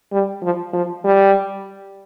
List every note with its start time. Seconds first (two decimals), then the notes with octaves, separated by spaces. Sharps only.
0.12 G3
0.43 F3
0.73 F3
1.04 G3